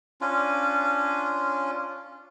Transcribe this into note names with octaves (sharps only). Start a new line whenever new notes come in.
C#4 D4 F4